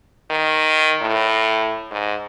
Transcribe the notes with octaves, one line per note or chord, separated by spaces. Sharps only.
D#3
A2
G#2